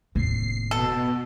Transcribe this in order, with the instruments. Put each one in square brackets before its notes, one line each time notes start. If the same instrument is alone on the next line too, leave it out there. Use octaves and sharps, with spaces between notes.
[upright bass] F1 D#2 [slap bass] A2 [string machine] C7
[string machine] B2 [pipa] A4